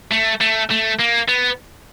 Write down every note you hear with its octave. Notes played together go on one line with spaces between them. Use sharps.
A3
A3
A3
A#3
B3